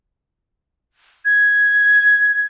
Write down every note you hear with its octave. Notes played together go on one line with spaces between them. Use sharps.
G#6